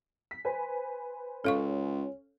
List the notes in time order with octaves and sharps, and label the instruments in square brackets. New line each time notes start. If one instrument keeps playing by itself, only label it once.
[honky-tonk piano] B6
B4 C5 G#5
[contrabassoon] C#2 [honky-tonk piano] C#4 [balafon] A4 F5 C#6